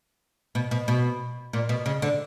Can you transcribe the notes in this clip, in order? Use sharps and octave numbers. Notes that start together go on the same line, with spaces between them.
B2
B2
B2
A#2
B2
C#3
D3